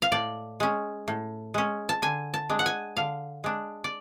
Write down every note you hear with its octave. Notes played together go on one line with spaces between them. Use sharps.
F5
A2 D5
G#3 C#4
A2
G#3 C#4
A5
D3 G#5
A5
G#3 D4
F#5
G#5
D3 F5
G#3 D4
D5